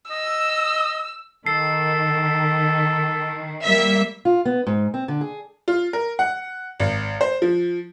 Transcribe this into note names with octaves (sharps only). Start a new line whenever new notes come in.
D#5 E6
D#3 A4 C7
G3 A#3 E5
F4
B3
G#2
C4
D3
G#4
F4
A#4
F#5
G#1
C5
F3